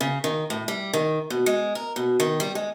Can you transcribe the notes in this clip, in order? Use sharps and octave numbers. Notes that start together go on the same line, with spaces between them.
C#3
D#3
A2
G3
D#3
B2
G#3
A#4
B2
D#3
G3
G#3